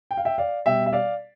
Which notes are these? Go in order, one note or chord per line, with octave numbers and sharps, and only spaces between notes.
G5
F5
E5 G5
D5 F5
B2 G3 E5 G5
E5
D5 F5